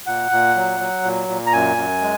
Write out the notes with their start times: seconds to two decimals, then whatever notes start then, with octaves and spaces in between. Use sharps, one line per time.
0.06 A#2 F#5
0.31 A#2
0.55 F#3
0.80 F#3
1.04 A#2
1.29 A#2
1.47 A#5
1.53 F#2 G#5
1.77 F#2
2.02 G#3